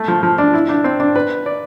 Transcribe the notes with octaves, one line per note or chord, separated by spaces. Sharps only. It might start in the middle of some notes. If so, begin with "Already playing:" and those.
Already playing: A3
F3
F3
D4
E4
D4
C4
D4
B4
D5